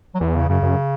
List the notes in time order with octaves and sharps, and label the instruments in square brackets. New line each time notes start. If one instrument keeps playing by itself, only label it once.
[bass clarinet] F#3
[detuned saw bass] E2 [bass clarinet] E3
[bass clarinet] C#3
[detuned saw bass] F#2 [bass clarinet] C#3
[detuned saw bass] F#2